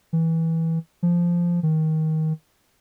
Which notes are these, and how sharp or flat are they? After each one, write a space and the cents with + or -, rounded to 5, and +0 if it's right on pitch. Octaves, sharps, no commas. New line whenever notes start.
E3 -15
F3 -10
D#3 +20